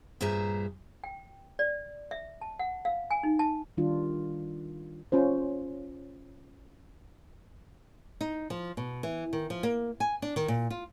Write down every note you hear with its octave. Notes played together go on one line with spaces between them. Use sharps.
G2 A#2 G#4 C5 E5 A#5
G5
D5
E5
A5
F#5
F5
G#5
D#4
A5
D#3 G3 D4 F4
C#4 F4 C5
D#4
F3
B2
E3
D#3
F3
A#3
G#5
D4
D#3
A#2
F4